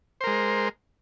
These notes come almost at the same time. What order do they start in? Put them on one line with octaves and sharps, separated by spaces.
C5 A#4 G#3